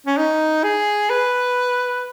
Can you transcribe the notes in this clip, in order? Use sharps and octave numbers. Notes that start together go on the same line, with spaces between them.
C#4
D#4
G#4
B4